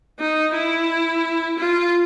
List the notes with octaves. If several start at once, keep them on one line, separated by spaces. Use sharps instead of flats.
D#4
E4
F4